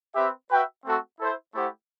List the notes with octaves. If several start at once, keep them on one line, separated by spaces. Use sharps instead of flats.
C4 G4 B4 E5
F#4 B4 E5 G5
A3 C4 F#4 A4
E4 A4 C5 E5
A3 E4 G4 C5 F#5